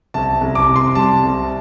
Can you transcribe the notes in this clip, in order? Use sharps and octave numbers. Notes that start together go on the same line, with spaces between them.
C2 A5
C2
D6
C3
C6
G3 A5
C2